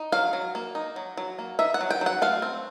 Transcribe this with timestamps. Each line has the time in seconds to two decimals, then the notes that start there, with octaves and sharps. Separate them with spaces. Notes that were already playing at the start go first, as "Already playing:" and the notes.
Already playing: D#4
0.12 F#3 F5
0.33 F#3
0.55 A#3
0.75 D#4
0.96 F#3
1.17 F#3
1.39 A#3
1.59 D#4 E5
1.74 F#5
1.81 F#3
1.91 G5
2.01 F#3
2.06 F#5
2.22 A3 F5
2.42 C4